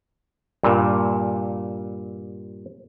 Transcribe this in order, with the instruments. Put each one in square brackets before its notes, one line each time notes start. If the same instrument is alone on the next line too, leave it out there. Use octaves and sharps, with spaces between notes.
[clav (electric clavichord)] G2 A#2